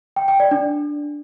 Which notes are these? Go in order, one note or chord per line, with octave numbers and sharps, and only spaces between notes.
G5
G5
D5
D4